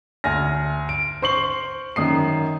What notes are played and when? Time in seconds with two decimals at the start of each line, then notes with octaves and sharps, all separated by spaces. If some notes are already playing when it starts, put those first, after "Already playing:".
0.24 D2 G#5 F6 A#6
0.89 D7
1.22 C5 C#6 C7 F#7
1.96 F#2 D#3 D#6 C7